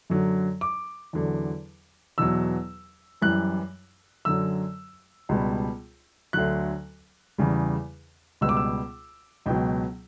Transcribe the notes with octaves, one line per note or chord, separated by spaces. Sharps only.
F#2 D3 F#3
D6
E2 D3 F#3
E2 B2 F#3 E6
F#2 E3 G3 F#6
F#2 D3 F#3 E6
C#2 B2 G3
D2 D3 F#3 F#6
E2 C#3 G3
C#2 B2 G3 E6
D6
E6
C#2 B2 F#3 G5